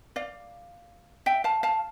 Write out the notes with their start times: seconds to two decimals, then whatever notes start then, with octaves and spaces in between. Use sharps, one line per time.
0.16 D5 F5
1.26 E5 G5
1.44 F5 A5
1.63 F5 A5